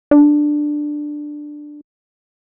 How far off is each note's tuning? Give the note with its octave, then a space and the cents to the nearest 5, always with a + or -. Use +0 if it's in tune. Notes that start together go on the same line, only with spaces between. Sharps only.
D4 +10